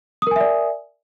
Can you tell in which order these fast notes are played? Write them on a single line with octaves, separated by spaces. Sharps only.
D#6 A#4 G#5 E5 D5